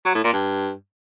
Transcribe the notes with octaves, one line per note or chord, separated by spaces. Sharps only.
F#3
A2
A#2
G2